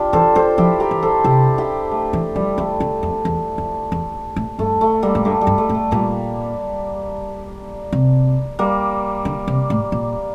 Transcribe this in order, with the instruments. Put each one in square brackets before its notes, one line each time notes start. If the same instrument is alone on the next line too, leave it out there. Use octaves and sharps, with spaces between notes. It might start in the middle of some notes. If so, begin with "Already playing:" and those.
Already playing: [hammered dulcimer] D4 F4 G4
[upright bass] E3 [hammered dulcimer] A4 C5
[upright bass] E3 [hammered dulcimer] A4 C5
[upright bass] F3 [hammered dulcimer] E4 G4
[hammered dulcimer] G4 A#4
[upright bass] E3
[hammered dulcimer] A4 C5
[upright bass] C3 [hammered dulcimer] E4 G4
[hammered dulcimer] E4 G4
A3
[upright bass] E3
[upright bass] F3 [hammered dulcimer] G3
[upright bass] E3 [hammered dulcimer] A3
[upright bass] D3
F2
E2
F2
E2
A2
[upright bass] G2 [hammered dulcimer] A3
[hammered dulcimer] A3
G3 A#3
[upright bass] A2
[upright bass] G2 [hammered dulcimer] A3
[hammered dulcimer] G3
[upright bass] G2
[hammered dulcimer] A3
[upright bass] A2
[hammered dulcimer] A3
[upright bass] A#2 [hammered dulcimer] G3 A#3
[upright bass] C3
[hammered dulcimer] G3 A#3
[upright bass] D3
C3
A2
A#2